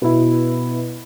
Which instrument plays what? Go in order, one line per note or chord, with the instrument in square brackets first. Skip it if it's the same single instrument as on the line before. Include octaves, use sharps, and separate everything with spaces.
[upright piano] B2 B3 E4